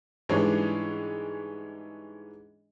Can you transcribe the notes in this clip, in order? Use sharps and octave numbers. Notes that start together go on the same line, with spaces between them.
G#2 E3 G3 C#4 D4 G#4